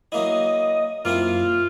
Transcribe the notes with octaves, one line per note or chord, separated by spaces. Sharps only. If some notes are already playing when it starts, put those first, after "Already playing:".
F#3 A#3 E4 D#5
F#2 A#3 C4 E4 F4